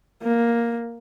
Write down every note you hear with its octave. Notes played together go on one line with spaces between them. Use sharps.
A#3